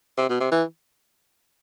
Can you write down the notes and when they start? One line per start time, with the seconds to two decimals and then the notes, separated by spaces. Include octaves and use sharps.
0.17 C3
0.29 B2
0.40 C3
0.51 E3